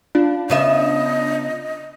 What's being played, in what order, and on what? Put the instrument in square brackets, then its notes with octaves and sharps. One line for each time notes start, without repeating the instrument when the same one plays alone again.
[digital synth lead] D4 [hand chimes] F4
[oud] C#3 B3 E5 [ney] D#5